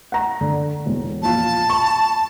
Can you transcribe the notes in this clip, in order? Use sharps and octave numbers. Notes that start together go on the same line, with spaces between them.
F#5 A#5
D3
E1
A#1 F4 A5
B5 C#6